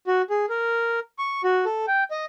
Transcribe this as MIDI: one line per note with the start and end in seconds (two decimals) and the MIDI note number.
0.07 0.22 66
0.30 0.46 68
0.49 1.00 70
1.19 1.42 85
1.44 1.65 66
1.65 1.86 69
1.88 2.04 79
2.11 2.25 75